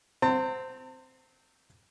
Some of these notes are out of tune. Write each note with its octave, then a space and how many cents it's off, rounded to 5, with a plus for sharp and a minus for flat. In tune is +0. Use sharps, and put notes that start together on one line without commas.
C4 -10 A5 +45